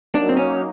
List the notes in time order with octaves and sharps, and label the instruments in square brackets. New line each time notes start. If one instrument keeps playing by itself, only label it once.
[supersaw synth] F#3 A#3 D#4 [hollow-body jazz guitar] D4
[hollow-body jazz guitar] C4
C#4